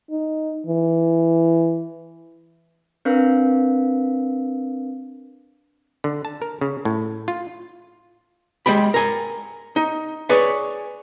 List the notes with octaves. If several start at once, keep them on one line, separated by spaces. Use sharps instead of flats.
D#4
E3
C4 D4 A#4 B4 F5
D3
A5
A#4
C#3
A2
F4
G#3 G4 G5 B5
A#4 G#5
D#4
G#4 B4 C#5 D5